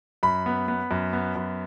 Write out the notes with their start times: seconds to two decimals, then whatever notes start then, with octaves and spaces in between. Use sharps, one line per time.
0.23 F#2 B5
0.46 B3
0.68 B3
0.91 F#2
1.13 B3
1.36 F#2